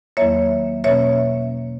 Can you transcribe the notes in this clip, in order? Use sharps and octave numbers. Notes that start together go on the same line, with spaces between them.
E2 D#3 F#3 A#3 C#5 E5
B2 A#3 C#4 C#5 E5